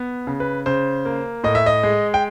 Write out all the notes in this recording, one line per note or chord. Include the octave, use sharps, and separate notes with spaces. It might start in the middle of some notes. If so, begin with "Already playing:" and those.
Already playing: B3
C#3
B4
C#3 C5
A#3
A2 D#5
E5
D#5
G#3
G5